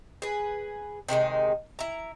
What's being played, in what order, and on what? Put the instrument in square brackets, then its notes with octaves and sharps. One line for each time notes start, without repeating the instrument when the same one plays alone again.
[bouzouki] G#4 B4
C3 D#3 G#3 D#4
E4 A#5